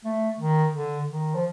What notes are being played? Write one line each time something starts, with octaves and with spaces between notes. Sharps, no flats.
A3
D#3
D3
D#3
F3